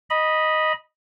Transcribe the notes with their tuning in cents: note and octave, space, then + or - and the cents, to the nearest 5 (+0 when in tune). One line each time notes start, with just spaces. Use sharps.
D#5 +0 B5 -20